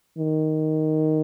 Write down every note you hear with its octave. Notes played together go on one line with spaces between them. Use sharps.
D#3